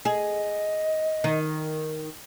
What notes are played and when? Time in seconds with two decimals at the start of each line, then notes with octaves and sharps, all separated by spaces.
0.05 G#4 D#5
1.24 D#3